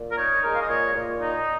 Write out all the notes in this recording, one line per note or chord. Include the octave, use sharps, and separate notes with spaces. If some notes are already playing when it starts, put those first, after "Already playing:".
Already playing: A#2
A#4
D#4 C#5
G#3 A#4
F5
D#5
A#2 C#5
A#2
D#4